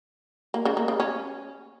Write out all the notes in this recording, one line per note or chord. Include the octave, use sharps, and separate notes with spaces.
A#3
C#3
A#3
C#3
C#4